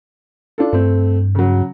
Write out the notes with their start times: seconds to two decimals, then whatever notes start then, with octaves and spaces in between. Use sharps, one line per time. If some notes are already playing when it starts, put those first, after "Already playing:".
0.58 D4 F4 A4
0.73 G2 A3 C4
1.35 C#3 F#3